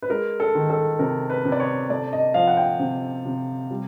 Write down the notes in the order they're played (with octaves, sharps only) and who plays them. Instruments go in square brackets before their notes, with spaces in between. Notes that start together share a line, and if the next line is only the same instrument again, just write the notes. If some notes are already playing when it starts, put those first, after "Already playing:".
[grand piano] B4
G#3 A#4
A4
D#3
A4
C3 A#4
B4
C3
D5
C#5
A3 D5
D#5
F3 F5
F#5
G5
C3
C3
G3